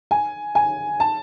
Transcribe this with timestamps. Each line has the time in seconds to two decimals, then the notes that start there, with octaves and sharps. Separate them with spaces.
0.11 G#5
0.55 G#5
1.00 A5